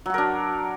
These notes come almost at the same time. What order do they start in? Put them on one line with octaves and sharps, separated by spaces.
F#3 F#4 A#4 D4